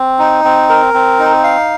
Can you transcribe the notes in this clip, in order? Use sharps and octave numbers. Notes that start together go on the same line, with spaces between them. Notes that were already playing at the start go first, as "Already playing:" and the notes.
Already playing: C4
D#4
C4
A#4
C4
D#4
F5